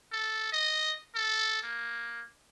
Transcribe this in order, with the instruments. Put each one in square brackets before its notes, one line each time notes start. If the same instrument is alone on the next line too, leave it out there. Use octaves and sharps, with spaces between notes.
[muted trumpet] A4
D#5
A4
A#3